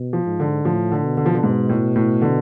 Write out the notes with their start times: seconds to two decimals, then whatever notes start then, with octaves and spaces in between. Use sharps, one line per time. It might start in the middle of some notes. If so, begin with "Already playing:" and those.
Already playing: B2
0.13 F3
0.26 G#2
0.40 D3
0.65 A2 F3
0.92 D3
1.04 B2
1.17 D3
1.26 F3
1.34 D3
1.43 G#2 B2
1.69 A2
1.96 A2
2.22 D3